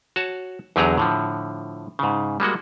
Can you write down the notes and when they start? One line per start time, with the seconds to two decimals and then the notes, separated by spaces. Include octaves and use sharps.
0.16 F#4 C#5 A5
0.76 E2 D3 F#3 G4 G#4 A#5
0.98 A2 D3 F3
1.99 G#2 C#3
2.40 G3 G#3 A#3 F#4